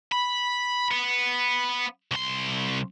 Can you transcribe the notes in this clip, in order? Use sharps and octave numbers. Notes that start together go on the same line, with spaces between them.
B5
B3
C2 C6